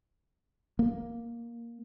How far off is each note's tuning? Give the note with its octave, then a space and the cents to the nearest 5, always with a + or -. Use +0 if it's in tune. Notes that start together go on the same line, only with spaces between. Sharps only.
A#3 +5